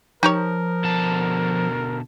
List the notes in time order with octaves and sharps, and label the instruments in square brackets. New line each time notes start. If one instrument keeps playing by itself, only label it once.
[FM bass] F3 [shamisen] D#4 G4 C#5 [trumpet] A#4
[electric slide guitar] B2 D3 A5